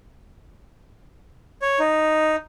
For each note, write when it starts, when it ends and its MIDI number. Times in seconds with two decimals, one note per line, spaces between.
1.62 1.79 73
1.79 2.36 63